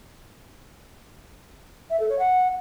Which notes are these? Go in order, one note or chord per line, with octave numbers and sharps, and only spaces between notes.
E5
A4
C#5
F#5